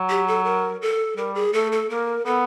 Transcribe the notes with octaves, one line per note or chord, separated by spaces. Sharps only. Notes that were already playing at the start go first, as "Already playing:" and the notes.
Already playing: F#3
G4
A4
A#4
A4
G3 A#4
G#4
A3 A4
A4
A#3 A#4
B3 A4